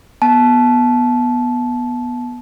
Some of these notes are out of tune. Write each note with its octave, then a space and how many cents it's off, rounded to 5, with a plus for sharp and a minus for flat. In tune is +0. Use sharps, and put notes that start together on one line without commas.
B3 -15 A5 -20